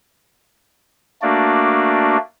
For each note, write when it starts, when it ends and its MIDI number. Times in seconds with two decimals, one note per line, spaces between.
1.22 2.17 57
1.22 2.17 58
1.22 2.17 62
1.22 2.17 66
1.22 2.17 74